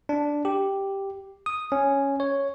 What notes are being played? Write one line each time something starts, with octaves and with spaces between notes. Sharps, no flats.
D4
G4
D#6
C#4
C#5